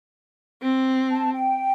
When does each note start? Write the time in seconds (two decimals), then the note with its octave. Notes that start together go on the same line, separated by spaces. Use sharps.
0.62 C4
1.11 A5
1.34 G5